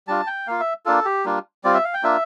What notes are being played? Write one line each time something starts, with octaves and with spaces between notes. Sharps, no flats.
G3 D4 F4 A5
G5
A#3 F4 F5
E5
A#3 D4 F4 A4
G4
G3 A#3 D4 F4
G3 C4 F4 D5
E5
F5
G5
A#3 D4 F4 E5